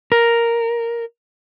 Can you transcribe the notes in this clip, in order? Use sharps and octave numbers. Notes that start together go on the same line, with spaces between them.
A#4